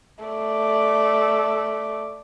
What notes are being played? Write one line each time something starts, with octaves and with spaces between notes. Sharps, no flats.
A3 D5